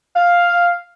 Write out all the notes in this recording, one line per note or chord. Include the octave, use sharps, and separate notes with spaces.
F5